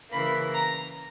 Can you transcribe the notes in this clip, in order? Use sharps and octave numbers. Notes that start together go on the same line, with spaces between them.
C#3 E3 A#3 B5
A#5